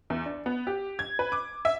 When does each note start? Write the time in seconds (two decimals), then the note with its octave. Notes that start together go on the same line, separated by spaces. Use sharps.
0.10 E2
0.26 D4
0.46 B3
0.67 G4
0.99 G#6
1.19 B4
1.32 D6
1.65 E5